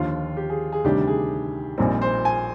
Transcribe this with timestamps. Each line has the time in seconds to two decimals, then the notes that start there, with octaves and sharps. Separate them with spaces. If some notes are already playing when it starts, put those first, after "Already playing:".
Already playing: D#2 D3 F3 F4
0.37 G4
0.50 G#4
0.72 G#4
0.84 D2 C3 D#3 G3 D4 G4
1.08 G#4
1.78 A#1 A#2 G3 C4 D#4
2.02 C5
2.25 G#5